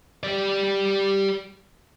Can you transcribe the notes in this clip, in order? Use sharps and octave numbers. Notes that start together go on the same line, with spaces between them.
G4 D5